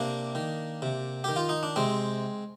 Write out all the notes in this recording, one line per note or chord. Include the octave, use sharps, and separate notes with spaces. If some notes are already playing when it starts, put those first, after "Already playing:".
Already playing: C3 A#3 D4
D#3
C3
D#3 G4
F4
D#4
D4
C3 G#3 C4